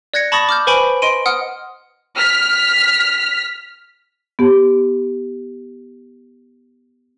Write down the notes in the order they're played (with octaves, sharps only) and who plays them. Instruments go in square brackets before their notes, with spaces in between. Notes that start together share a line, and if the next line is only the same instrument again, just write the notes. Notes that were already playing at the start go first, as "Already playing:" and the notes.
[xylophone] D5 F#6 G#6 A#6 C#7
A5 B5 C#6 D#6 A6 A#6
D6 F6 G6
B4 C5 G#5 B5 C#6 D7
D#5 C6 D7 D#7
F#5 D#6 F6
[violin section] F6 B6
[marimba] B3 G4